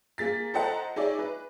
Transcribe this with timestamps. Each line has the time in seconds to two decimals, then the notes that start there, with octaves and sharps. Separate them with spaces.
0.18 A#3 G#4 A6 B6
0.54 A4 C5 D#5 F#5 A5 A#5
0.96 D#4 G#4 C#5 D5 E5
1.19 B4